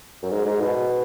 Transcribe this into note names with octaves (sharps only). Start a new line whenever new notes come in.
F#2
G#2
G#2
B2